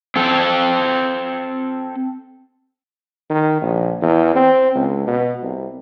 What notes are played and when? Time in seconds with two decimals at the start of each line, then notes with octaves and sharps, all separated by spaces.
0.16 C4 A4
3.30 D#3
3.62 A#1
4.02 E2
4.35 C4
4.75 C#2
5.07 B2
5.43 C2